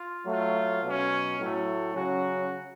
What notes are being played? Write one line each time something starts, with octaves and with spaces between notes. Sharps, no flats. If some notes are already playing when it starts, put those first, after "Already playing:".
Already playing: F4
F#3 A3 F4
B2 F#3 C#4
A2 F#3 A3
C#3 F#3 C#4 F#4